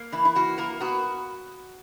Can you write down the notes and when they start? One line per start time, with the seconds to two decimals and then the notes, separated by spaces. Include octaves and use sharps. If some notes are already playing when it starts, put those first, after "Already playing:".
Already playing: A#3
0.12 E3 E4
0.25 E4
0.35 A#3 F#4
0.58 A#3 A#4
0.80 B3 F#4